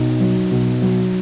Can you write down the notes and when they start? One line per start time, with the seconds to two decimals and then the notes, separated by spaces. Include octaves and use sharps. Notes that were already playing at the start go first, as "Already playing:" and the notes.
Already playing: B2 D#4
0.20 F#3
0.51 B2
0.82 F#3